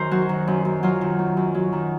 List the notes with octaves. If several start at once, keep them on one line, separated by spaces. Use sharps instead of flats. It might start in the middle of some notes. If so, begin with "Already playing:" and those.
Already playing: F#2 D#3 A#4 C5
F#3 F#4
D#3
F#2
F#2
F#3 F4
D#3
F#2
F#2
F#3
D#3